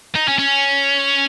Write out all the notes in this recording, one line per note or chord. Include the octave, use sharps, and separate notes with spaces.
D#4
C#4
C#4